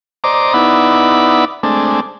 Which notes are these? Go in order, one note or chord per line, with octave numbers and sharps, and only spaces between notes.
C5 D5 D#5 A#5 D6
B3 D#4 E4 D5 F#5 B5
G#3 A3 C4 D4